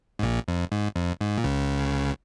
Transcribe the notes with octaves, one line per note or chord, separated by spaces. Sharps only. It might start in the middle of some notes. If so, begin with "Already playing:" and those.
G#2
A#1 A#2
F2
G#2
F2
G#2
A#2
C#2 C#3